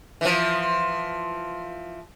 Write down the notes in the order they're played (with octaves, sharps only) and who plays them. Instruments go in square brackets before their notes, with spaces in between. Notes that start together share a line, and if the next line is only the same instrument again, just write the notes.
[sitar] E3 F3